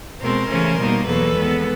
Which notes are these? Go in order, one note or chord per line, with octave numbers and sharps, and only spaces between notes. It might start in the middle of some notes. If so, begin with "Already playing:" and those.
B2 G#3 C4 A#4 C5
C#3 E3 A3 C#4
B2 G3 A#3 D#4
E2 B2 F#3 A#3 A4 B4
D#3 G#3 B3